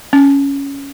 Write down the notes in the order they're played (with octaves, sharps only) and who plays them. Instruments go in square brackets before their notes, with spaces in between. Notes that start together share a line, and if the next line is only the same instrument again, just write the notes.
[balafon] C#4